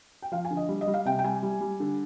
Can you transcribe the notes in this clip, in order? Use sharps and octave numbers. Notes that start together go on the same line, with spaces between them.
G5
F3 F5
G#5
D3
D#5
G3
D#5
G3
F5
C3 G5
G5
G3 G#5
G3
G3
D3